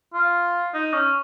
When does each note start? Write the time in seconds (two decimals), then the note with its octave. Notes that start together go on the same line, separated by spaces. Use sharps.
0.14 F4
0.74 D#4
0.93 C#4